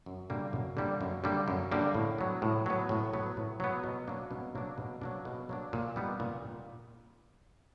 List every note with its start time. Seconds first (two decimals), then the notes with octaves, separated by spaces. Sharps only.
0.06 F#2
0.30 D3 G3 A#3
0.53 F#2
0.77 D3 G3 A#3
1.01 F#2
1.24 D3 G3 A#3
1.48 F#2
1.72 D3 G3 A#3
1.95 A2
2.18 F#3 B3
2.42 A2
2.66 F#3 B3
2.89 A2
3.13 F#3 B3
3.37 A2
3.60 F#3 B3
3.84 B2
4.07 F#3 A#3 D4
4.31 B2
4.55 F#3 A#3 D4
4.78 B2
5.01 F#3 A#3 D4
5.25 B2
5.49 F#3 A#3 D4
5.73 A#2
5.96 G3 B3 D#4
6.20 A#2